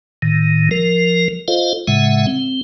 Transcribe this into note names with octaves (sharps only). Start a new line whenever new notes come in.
A2 D#3
F3 A#4
F4 A4 C5 D#5 F5
A2 C#3 G#3 E5 F#5
C4